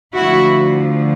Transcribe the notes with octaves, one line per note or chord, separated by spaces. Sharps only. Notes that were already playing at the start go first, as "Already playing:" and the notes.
D2 D3 F3 E4 F#4